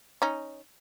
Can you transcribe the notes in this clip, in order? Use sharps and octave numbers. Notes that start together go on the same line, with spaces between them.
C#4 D#4